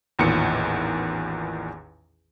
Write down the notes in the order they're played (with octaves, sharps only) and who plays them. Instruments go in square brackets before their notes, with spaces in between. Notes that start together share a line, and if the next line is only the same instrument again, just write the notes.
[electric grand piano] A1 E2 A#2 D#3 C#7